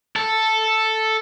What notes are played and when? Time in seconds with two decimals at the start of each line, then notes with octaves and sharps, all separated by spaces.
0.16 A4